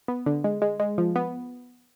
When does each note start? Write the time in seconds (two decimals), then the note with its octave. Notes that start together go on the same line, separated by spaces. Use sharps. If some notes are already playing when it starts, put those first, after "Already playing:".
0.08 B3
0.26 D3
0.44 G#3
0.62 G#3
0.80 G#3
0.98 F3
1.16 B3